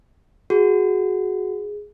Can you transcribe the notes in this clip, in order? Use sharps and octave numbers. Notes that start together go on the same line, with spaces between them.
F#4 G#4